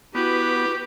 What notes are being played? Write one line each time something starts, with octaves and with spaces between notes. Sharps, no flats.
B3 E4 F#4 G4 B4